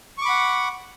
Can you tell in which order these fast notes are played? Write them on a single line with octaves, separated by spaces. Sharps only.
C#6 D6 B5 F#5